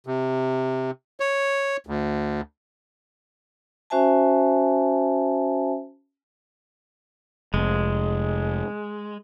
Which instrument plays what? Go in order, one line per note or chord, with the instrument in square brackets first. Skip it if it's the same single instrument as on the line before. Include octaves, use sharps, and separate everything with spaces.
[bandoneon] C3
C#5
D2
[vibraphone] C#4 F#4 C5 E5 G#5 A5
[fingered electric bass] F1 [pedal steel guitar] G#3